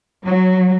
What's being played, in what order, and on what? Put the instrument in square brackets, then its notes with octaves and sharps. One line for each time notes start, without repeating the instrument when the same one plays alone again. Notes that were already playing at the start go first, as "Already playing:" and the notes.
[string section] F#3